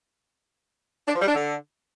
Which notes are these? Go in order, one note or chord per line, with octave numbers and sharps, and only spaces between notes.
D4
F3
G3
D4
D3